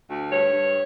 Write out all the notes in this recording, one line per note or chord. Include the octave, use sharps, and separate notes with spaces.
D2
G2 C#5
G2